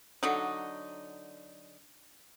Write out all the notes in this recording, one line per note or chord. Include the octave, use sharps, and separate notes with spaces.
D3 F#3 D#4